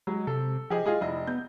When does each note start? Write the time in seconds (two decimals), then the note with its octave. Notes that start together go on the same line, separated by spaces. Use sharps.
0.07 F#3 G#3
0.27 C3 A4
0.70 F3 G4 G#4 D#5
0.86 G#3 F4 G#4 D#5
1.01 F1 E4 D#5
1.27 B3 G6